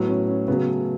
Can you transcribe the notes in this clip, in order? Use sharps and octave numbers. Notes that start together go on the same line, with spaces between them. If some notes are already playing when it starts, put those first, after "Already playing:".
Already playing: A2 F#3 B3
C#4
C#4
C#3 F#3 B3
B3
A3